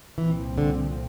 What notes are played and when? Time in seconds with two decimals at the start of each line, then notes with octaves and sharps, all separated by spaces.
0.18 C2 A#2 E3 F3 C4
0.58 D3